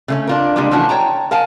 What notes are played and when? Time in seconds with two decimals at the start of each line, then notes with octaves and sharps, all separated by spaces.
0.08 C#3 A3 C#4
0.27 D4 F4 A#4
0.56 C#3 G3 G#3 A#3 D4
0.71 E3 F3 A3 C#4 D4 F#4
0.89 C#5 G5 A5 A#5
1.31 A#4 F5 G#5 A5